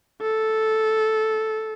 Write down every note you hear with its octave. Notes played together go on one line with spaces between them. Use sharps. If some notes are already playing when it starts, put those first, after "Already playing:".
A4